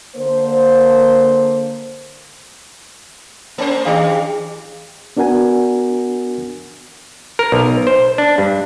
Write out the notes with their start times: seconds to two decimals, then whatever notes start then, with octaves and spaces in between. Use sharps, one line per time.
0.16 D3 A#3 C5
3.58 A3 C#4 C5
3.85 D#3 D4 G4 G#4 F5
5.17 B3 D4 F#4 A#4 F#5 G#5
7.39 A#4
7.52 B1
7.87 C5
8.18 D4
8.38 G2